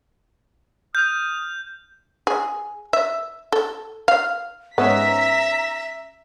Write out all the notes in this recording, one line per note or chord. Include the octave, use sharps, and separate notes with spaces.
D#6 F6 G6
G#4
E5
A4
F5
G#2 B3 C#4 E5 A#5 B6